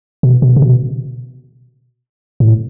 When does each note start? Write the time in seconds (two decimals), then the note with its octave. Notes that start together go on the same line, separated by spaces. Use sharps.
0.23 B2
0.42 B2
0.56 C3
0.62 B2
2.40 A2